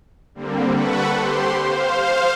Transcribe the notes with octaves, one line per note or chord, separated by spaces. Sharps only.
D3 G3 A#3 C4
A4 B4 F#5 B5 C#6
G4 C5 C6
C5 F5